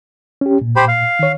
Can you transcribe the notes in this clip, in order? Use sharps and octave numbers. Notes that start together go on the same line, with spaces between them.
C#4 G4
A#2
G4 C5 B5
F5
D#3 C#5